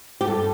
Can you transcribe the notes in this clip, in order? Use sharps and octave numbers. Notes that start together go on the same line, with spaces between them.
G4
G2 A4